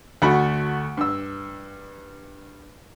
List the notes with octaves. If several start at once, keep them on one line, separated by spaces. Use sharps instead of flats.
D2 A3 F#4 B5
G2 E6